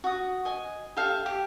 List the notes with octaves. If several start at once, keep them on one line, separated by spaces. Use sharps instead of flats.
F#4 D#6
D#5 G#5
G4 A4 E5 F5
G4